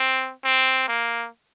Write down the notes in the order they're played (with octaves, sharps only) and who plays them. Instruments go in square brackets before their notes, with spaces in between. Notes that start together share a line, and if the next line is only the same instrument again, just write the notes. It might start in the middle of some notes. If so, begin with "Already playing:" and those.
Already playing: [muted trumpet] C4
C4
A#3